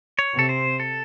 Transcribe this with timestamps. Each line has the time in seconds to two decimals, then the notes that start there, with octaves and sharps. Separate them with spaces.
0.19 C#5
0.34 C3 A4
0.49 C5
0.80 A4